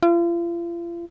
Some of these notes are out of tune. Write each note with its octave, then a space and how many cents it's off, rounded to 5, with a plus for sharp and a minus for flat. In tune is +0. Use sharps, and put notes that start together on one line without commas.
F4 -40